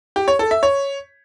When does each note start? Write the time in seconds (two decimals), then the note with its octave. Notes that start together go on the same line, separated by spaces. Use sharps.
0.16 G4
0.28 C#5
0.39 A4
0.51 E5
0.63 C#5